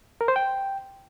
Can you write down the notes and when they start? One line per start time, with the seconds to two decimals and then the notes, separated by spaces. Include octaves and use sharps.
0.21 A#4
0.28 C5
0.36 G5